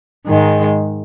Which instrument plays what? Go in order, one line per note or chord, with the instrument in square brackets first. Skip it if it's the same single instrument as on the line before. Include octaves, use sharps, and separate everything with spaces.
[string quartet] G#2 D#3 G#3